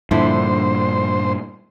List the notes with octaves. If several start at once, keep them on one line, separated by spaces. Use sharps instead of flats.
G2 A#2 D3 F3 E4 C5